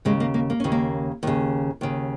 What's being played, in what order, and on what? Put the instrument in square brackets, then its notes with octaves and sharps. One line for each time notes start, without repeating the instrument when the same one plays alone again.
[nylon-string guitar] D#2 C#3 G#3
A#3
A#3
A#3
D#2 C#3 C#4
A#3
D#2 C#3
D#2 C#3